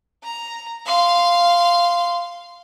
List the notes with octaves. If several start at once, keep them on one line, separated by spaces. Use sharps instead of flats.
A#5
F5 C6